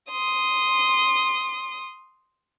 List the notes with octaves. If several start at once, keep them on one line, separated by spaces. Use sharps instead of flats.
C6 D#6